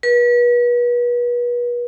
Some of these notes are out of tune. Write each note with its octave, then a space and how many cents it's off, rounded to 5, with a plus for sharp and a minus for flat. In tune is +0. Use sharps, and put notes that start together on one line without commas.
B4 -35